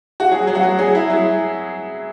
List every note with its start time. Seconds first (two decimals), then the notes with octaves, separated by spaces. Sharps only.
0.20 F#4
0.31 F#3 G#4
0.47 F#3
0.55 F#4
0.63 F#3
0.79 F#3 G#4
0.95 E4
1.10 F#3